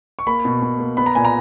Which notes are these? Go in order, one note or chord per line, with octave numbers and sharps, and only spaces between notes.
C#6
A#3 B5
B2
B2
A#3
B3 B5
A#5
A#2 G#5
A#5